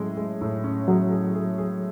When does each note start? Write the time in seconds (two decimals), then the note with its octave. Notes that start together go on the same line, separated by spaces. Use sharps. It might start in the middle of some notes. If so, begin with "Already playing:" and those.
Already playing: A2 F#3 G#3 C#4 G#4
0.17 G#3
0.41 A2
0.64 C#4
0.88 F#3 G#4
1.12 G#4
1.35 G#4
1.58 G#4